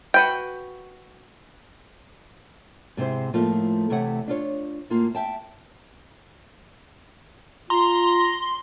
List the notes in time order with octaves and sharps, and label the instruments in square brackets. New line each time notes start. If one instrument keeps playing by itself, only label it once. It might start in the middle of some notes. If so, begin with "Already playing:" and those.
[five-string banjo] F#4 B4 G5
[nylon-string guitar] G#2 C3 C4 E4 C5
A2 F3 A3 A#3 E4 F4
C3 E3 A3 C#5 F#5
D4 F4 C#5
A2 A#3 F4
E5 G5 A5
[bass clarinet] F4 [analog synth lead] A#5 [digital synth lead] C6